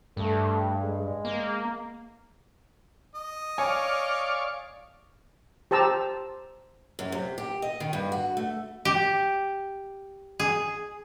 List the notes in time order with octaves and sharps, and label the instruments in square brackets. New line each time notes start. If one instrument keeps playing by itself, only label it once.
[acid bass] G2 [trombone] A3
[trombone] G#3
[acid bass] A#3
[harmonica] D#5
[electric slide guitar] C#5 G#5 [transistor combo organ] D5 F5 C#6
[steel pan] G4 C5 A5 A#5 E6
[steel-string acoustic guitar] F#2
C3
G4
D#5
D#3
G2
F#4
A3
[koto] G4
G#4